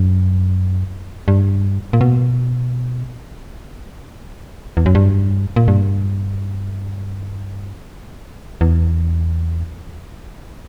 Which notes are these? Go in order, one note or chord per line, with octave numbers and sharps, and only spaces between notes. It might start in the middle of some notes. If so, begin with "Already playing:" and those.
Already playing: F#2
G2
A#2
B2
E2
F#2
G2
A#2
G2
E2